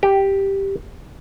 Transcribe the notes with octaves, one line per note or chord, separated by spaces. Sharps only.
G4